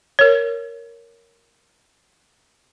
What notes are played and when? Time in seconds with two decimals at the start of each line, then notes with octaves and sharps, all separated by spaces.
0.19 A#4 C#5